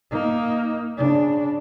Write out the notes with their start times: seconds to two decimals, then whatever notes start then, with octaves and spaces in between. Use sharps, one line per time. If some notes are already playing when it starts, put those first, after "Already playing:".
0.11 A#3 D#4
0.97 C#3 D4